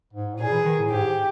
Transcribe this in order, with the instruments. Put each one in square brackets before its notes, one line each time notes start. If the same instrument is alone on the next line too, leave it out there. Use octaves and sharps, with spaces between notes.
[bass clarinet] G#2
A2
[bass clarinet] A#2 [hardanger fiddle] G#4
[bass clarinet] E3
D#3
A2
[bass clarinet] G#2 [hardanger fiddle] G4